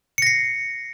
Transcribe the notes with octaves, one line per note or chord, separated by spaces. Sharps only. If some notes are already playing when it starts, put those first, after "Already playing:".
A#6 C7 C#7